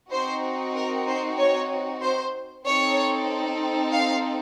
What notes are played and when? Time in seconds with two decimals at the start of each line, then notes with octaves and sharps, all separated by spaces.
0.11 C4 D#4 F#4 C5
0.75 A#4
1.07 C5
1.38 C#5
2.02 C5
2.65 C4 D#4 A4 C#5
3.92 F5